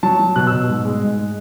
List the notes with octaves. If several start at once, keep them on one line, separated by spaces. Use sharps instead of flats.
F#3 A5
F#3
B2 F#6
E6
B2
G#2
G#3
G#2
G#3